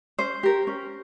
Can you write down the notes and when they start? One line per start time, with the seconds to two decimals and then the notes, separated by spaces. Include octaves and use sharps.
0.18 C#4 C5
0.43 G4 A#4
0.67 C#4